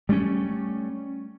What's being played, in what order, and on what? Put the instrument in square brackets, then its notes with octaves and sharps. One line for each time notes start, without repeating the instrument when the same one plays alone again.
[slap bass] G3 A3 C4 C#4